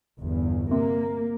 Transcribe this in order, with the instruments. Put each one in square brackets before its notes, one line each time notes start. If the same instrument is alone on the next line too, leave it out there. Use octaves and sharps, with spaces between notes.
[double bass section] G1 E2
[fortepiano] C3 [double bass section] A#3